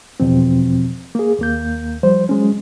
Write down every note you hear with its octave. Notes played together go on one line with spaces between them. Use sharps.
E2 B2 F3 C4
A#3 G#4
D#2 A#3 G6
F3 G3 C5
F#3 G#3 C#4